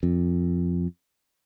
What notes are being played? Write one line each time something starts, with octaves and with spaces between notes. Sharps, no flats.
F2